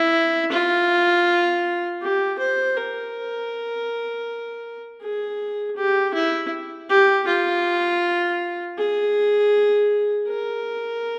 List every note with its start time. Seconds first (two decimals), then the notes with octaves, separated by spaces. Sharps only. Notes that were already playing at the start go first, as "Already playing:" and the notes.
Already playing: E4
0.51 F4
2.01 G4
2.39 C5
2.76 A#4
5.02 G#4
5.76 G4
6.14 E4
6.89 G4
7.27 F4
8.77 G#4
10.27 A#4